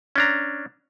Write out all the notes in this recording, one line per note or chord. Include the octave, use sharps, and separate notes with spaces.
C#4 D4 A#5